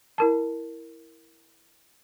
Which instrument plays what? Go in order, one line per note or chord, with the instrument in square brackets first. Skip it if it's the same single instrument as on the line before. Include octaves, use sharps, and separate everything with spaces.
[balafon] E4 A#4 A5